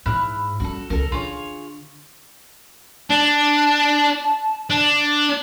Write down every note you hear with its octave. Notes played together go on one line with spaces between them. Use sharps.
G#2 E4 F6 F#6
G3 C#4 F#4 A4
C#2 C#4 A4 A#4
D3 F4 G#4 C#5
D4 A5
D4